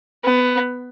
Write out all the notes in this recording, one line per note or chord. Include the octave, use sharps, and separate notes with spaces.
B3